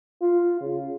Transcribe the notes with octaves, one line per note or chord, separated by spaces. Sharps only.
F4
C#3